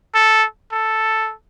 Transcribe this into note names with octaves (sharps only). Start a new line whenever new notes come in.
A4
A4